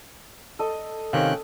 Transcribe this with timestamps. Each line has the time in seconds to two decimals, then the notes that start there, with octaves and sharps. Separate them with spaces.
0.59 A4 D#5
1.13 C3 D#3 C#4 F5 G5 F#6